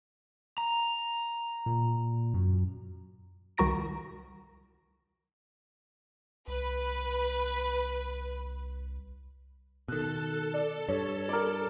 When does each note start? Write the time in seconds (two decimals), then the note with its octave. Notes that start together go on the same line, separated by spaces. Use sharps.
0.58 A#5
1.66 A#2
2.34 F#2
3.57 C2 D#3 F#4 A#5 A#6 D7
6.48 C2 B4
9.88 B2 D#3 A4 F#6
10.54 D5
10.89 G2 C#5
11.29 A#4 D5